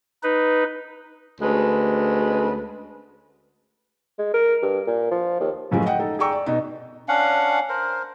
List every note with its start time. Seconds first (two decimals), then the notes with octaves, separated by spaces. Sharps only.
0.23 D#4 B4
1.41 D2 G#3 C#4 B4
4.19 G#3
4.34 A#4
4.63 G2
4.87 A#2
5.11 F3
5.40 D#2
5.71 F#2 A2 F3 F#3 G#3
5.86 D#5 F#5 G5
5.99 D#4 A4
6.19 G#4 D5 G5 A#5 C#6 E6
6.32 D5
6.46 B2 D#4
7.08 C#4 D4 F5 F#5
7.69 A#4 C5